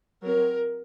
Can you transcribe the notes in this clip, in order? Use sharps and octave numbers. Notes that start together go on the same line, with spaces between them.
F#3 C4 A#4